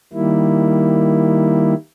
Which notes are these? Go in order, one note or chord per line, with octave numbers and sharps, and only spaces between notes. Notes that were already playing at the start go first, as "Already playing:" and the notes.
D#3 G3 A#3 E4